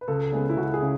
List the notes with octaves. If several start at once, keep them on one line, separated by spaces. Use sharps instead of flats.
B4
C#2 A4
C#3 G#3 B3
E4
C#2 F#4
G#4
C#3